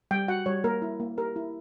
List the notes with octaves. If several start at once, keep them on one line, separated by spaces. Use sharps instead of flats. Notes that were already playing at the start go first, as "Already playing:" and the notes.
G3 G5
F#4 F#5
G3 C#5
A#3 A#4
E4
A#3
G4 A#4
E4